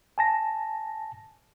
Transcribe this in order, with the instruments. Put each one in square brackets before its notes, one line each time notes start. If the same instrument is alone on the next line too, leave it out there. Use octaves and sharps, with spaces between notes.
[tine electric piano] G#5 A5 A#6